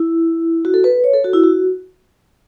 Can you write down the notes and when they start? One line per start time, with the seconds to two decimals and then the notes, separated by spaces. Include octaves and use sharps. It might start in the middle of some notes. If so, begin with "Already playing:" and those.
Already playing: E4
0.65 F#4
0.74 A4
0.84 B4
1.04 C#5
1.13 A4
1.24 F#4
1.33 E4
1.44 F#4